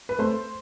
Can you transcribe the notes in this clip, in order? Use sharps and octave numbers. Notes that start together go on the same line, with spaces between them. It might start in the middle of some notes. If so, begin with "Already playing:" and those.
B4
A3 C5